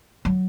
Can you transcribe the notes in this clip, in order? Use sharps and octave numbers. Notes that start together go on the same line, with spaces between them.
F#3